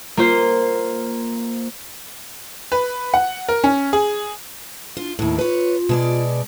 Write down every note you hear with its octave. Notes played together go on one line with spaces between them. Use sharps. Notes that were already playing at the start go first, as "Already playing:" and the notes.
A#3 F4 C5
B4
F#5
A#4
C#4
G#4
D4 F4
D#2 A2 E4
F4 B4 C#5
B2 G#3 D5